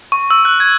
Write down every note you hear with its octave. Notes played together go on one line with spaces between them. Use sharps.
C#6
E6
F#6
G#6